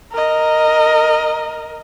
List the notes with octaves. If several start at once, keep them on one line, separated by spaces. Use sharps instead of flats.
A#4 D#5